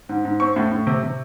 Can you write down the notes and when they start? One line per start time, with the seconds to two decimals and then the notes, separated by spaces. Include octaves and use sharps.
0.09 G#2
0.25 G#2
0.40 C4 C#6
0.56 A2
0.72 A2
0.87 C3
1.03 C3